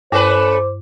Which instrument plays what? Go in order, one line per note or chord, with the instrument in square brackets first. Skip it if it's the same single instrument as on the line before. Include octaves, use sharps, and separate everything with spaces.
[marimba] G2 [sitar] A3 C#4 B4 [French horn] C5 [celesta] D6